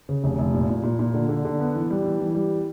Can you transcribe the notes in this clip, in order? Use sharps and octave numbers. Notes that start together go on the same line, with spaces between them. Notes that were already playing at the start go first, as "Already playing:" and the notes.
C#3
F1
F1
A#2
A#2
A#2
A#2
D3
D3
D3
B3
E3
G3
E3
E3
G3